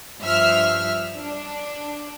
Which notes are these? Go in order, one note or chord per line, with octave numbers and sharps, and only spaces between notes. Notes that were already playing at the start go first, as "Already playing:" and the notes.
G2 F3 E5 F6
D4